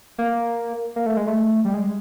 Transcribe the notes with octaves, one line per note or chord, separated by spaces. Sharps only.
A#3
A#3
A3
G#3
A3
G3
G#3